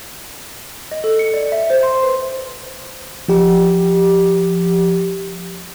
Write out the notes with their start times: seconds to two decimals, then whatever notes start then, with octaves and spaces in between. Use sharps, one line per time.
0.91 D#5
1.04 A4
1.19 C#7
1.34 D5
1.52 E5
1.70 C5
1.83 C6
2.03 B4
3.28 F3 G4